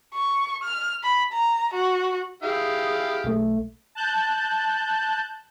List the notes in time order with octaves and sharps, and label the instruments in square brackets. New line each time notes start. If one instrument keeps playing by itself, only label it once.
[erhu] C#6
F6
B5
A#5
F#4
[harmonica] E4 G4 F5 [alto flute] G#4
[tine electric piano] B1 A3
[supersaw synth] A5 F#6 G6